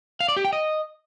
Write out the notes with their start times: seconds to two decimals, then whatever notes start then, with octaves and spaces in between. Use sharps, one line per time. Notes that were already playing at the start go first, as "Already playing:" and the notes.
0.20 F5
0.28 D5
0.37 G4
0.45 G5
0.53 D#5